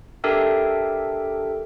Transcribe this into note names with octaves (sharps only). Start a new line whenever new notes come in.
D4 G4 A4 A#4 E5 G5